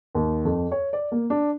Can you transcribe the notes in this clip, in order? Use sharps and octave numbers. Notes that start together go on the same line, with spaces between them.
D#2
F2
C#5
D5
A#3
D4